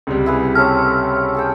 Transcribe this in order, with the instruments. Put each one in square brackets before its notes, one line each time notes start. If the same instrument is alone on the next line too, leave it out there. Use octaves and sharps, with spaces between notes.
[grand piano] C#2 C3 G3
[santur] E4 G#4 B4
[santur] C4 C#4 A4 [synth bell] F6
[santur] G#4 A4 G5